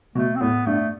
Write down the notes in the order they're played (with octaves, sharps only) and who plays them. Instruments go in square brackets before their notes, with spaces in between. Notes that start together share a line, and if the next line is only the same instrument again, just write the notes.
[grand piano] B2 [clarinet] A3
[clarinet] C4
[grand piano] A2 [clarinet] B3
[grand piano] G2 [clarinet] A3